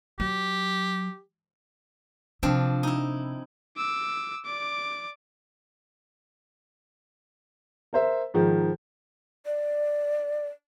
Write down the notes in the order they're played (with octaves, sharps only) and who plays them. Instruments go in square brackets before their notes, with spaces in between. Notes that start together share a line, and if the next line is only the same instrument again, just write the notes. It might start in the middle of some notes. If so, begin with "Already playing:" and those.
[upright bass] F#3 [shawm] G4
[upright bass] C3 [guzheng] F3 C4 D4
[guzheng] D#4 E4
[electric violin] D6 E6
D5 D6
[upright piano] A#4 C5 E5
G#2 D#3 F3
[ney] D5